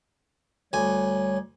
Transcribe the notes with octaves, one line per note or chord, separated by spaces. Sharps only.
D2 G3 C#5 G#5